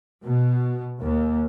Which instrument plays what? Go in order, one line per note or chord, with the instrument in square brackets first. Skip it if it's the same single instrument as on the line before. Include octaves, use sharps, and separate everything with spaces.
[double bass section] B2
D#2